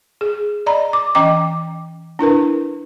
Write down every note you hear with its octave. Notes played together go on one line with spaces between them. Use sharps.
G#4
D5 D#5 A#5 B5
D6
E3 C#4 D#5 G5 A#5 D6
D4 E4 A#4 B4